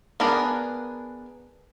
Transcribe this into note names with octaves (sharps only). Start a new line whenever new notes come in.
B3 D4 G#4 A#4